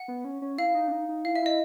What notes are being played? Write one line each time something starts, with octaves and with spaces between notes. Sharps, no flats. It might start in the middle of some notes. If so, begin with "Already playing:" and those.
Already playing: F#5
B3
C#4
C#4
E4 F5
D#4
D4
D#4
D#4
E4 F5
E5
E4 D#5